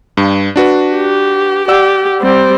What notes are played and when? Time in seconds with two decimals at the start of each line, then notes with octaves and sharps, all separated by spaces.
0.17 G2
0.56 D4 F#4 B4
0.96 G4
1.68 G4 D5 F#5 E6
2.21 G3 C4